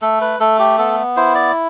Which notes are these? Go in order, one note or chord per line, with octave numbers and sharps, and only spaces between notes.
A3 A4
B4
A3 A4
G4
B3 A4
E4 C5
D5